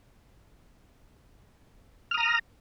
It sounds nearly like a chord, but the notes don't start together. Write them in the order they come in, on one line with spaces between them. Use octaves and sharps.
F6 D#6 A#5